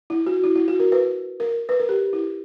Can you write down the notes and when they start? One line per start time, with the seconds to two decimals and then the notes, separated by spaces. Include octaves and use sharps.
0.10 E4
0.27 F#4
0.44 E4
0.56 E4
0.68 F#4
0.80 A#4
0.92 B4
1.40 A#4
1.69 B4
1.80 A#4
1.89 G4
2.13 E4